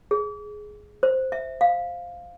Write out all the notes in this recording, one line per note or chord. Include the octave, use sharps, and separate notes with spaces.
G#4
C5
E5
F5